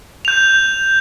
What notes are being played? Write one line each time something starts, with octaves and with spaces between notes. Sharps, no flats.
G6 F7